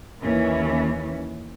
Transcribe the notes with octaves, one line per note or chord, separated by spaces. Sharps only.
D#2 E3 C#4